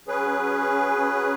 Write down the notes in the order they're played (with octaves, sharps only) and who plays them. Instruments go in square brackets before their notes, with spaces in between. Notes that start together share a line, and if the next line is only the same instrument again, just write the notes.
[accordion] F#3 C#4 G#4 B4